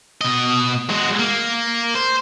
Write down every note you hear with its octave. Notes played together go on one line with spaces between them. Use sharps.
B2 D#5
G#3 F#4
A#3
C5